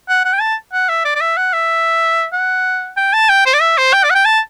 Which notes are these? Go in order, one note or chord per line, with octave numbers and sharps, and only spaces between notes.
F#5
F#5
G5
A5
F#5
E5
D5
D5
E5
F#5
E5
F#5
G5
A5
G5
C5
D5
E5
C5
G5
D5
F#5
G5
A5